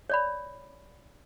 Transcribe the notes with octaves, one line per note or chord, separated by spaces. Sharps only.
C#5 D5 B5